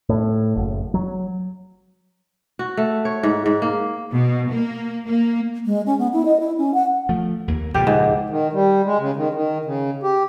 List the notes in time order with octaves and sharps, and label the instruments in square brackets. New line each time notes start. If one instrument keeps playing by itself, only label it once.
[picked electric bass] A2
F#1
F#3
[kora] F#4
A3
C#5
G#2
G#2
A#3
[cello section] B2
A#3
A#3
[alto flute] G#3
C#4
B3
E4
D#5
E4
C#4
F#5
[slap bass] F3 A3
D#2 A#3
[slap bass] C#2 A#2 F3 [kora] G4
[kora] G#2
[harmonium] D#3
G3
G#3
C#3
D#3
D#3
C#3
G4